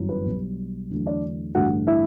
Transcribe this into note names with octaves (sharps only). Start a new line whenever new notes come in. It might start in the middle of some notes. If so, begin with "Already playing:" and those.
Already playing: G1 F#2 E3
B4
B1 B2 G3
E2 D3 F#3 A3
D4 D5
A1 G2 D3 A3 F#4 F#5
E4 E5